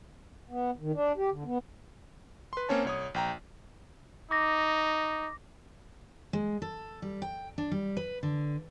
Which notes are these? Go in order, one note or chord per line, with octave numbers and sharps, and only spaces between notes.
B3
D#3
D4
G4
D3
B3
B4 C6
A#3 C4 C#4 C#5 A5
C2 C#5 D#6
A#1 G5 A#5
D#4 D6 A#6
G#3
A4
G3
G5
D4
G3
B4
D3